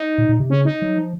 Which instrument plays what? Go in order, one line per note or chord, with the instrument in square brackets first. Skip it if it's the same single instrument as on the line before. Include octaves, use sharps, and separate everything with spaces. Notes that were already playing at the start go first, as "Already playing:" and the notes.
Already playing: [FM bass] D#4
[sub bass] A#2
A#2
C3
[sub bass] C#3 [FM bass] C#4
[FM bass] D#4
[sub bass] F#3
F3